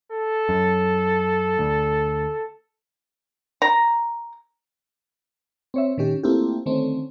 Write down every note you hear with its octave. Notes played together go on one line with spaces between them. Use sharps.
A4
F#2
D2
A#5
C4 C#5 E5
A#2 D#3 C#4 G4
A3 A#3 C4 E4 F4 G4
D3 D#3 A3 C4 C#4